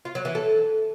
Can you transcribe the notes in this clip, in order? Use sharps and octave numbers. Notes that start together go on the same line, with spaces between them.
F4
F#3
E3
A4